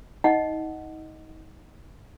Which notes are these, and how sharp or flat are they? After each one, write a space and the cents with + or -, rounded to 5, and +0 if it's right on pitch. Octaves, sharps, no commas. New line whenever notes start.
D#4 +30 D#5 +0 F#5 +0